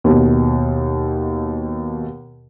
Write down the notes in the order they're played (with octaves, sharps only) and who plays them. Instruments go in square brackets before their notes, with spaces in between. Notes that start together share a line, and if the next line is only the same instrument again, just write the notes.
[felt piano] D#2 B2